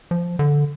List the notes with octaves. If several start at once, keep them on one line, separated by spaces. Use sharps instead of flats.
F3
D3